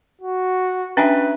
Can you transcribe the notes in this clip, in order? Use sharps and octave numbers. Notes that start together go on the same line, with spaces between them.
F#4
C#4 D4 B4 D#5 E5 G5 G#5